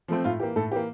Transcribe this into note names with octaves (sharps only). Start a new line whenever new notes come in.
F3 A3 C4
A2 F4
E3 A#3 G4
A2 A4
E3 A#3 G4